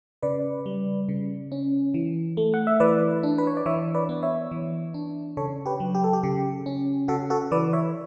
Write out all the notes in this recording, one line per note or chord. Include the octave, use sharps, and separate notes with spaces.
C#3 B4 D5
G3
C#3
C#4
E3
A3
F#5
E5
E3 B4 D5
D4
B4
C#5
D5
E3 C#5 E5
B4 D5
B3
C#5 E5
E3
D4
C#3 A4 C#5
G4 B4
F#3
G4
A4
G4
C#3 G4
C#4
C#3 F#4 A4
F#4 A4
E3 B4 D5
C#5 E5